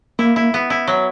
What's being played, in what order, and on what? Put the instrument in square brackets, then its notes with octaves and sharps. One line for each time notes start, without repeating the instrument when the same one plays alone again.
[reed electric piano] A#3 [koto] E4
[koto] E4
B3
E4
F#3